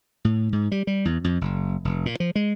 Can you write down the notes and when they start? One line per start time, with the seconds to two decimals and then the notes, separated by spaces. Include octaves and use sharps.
0.25 A2
0.52 G#2
0.72 G3
0.87 G3
1.05 E2
1.24 F2
1.41 F#1
1.85 F1
2.06 A#2
2.20 F3
2.36 G#3